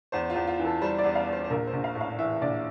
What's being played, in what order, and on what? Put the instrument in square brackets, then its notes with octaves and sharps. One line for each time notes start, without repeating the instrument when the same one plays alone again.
[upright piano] E2 C5
F4
E2
F4
E3
A4
G3 C5
D5
E2
F5
E2
C5
C5
A#1 A#4
C5
A#1
F5
A2
F5
E3 E5
A#1 D5